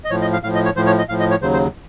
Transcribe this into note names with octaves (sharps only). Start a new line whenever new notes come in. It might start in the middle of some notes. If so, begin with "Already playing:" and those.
D#5
A2 F3 C#5
D#5
F5
A2 F3 F5
D#5
C#5
A2 F3 C5
C#5
D#5
A2 F3 F5
D#5
C#5
D#2 C#3 F#3 C5
C5